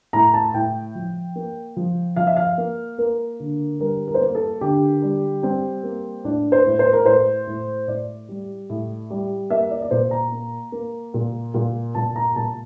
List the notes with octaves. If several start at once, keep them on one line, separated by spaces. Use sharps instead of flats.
A2 A#5
A5
A2 G5
F3
A#3
F3
F3 F5
E5
F5
A#3
A#3 A#4
D3
G3 A#4
A#4
C5
A#3 A#4
A4
D3 G4
G3
G3 C4
A#3
A2 D4
C5
A2
C5
A#4
A2 C5
A2
A2 D5
G3
A2
G3
A#3 E5
D5
D5
A#2 C5
A#5
A#3
A#3
A#2
A#2
A#2 A5
A#5
A#2 A5